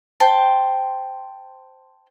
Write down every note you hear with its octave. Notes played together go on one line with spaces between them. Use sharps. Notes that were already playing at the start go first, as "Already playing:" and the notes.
C5 G5 A5